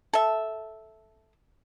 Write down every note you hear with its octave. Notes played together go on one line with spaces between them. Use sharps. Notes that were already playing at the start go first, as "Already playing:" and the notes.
A4 E5